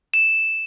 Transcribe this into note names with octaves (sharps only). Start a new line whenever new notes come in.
E7